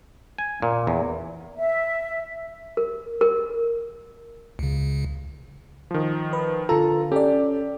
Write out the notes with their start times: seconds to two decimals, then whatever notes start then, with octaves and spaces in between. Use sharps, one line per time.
0.38 G#5
0.62 A#2
0.87 E2
1.56 E5
2.77 A#4
3.21 A#4
4.59 C#2 C#3
5.91 D#3 F3
6.33 B4
6.69 D3 F4 A4 A#5
7.12 C#4 G4 A4 D5